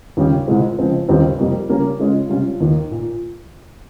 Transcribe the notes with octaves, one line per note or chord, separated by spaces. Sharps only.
D#2 C#3 G3 C#4 G4
C2 A#2 G#3 C4
C#3 F3 G#3 C4
D#2 C#3 G3 C4 D#4
F2 C3 G3 A#3
C#3 G3 A#3 C#4
C#3 G#3 C#4 F4
C3 G3 C#4 F4
D#2 D#3 A#3
A#2